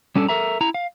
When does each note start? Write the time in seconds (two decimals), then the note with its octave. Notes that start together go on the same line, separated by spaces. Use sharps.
0.16 G3 C#4 D4 A4
0.29 A4 A#4 E5 A#5
0.61 E4 A#5
0.74 F5